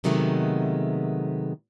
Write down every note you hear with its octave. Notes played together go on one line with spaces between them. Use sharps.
C3 D#3 F#3 G#3 A3 B3